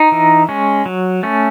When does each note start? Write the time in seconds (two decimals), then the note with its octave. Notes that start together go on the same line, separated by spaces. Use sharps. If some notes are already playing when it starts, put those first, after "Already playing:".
Already playing: D#4
0.12 E3
0.49 G#3 C#4
0.86 F#3
1.23 A3 C#4